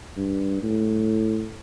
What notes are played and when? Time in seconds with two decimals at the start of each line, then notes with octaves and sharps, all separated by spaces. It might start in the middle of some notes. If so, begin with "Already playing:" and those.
0.17 G2
0.63 A2